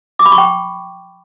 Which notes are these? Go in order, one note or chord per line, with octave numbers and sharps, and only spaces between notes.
D6
B5
C#6
G5